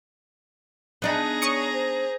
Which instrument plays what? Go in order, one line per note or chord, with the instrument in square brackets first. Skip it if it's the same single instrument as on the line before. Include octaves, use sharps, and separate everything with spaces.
[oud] B3 D4 D#4 [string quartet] G#4 A#5
[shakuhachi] C#5 [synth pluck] C#6 D#6 C#7
[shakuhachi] C5